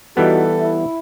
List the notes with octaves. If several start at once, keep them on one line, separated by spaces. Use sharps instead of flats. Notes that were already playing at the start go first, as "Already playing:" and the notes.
E3 G3 B3 D#4 F#4 A4
E4